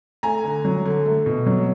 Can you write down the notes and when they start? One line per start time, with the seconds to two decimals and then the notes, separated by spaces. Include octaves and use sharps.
0.23 A3 G#5 A#5
0.44 D3
0.65 F#3
0.85 D3
1.06 A3
1.26 B2
1.46 F#3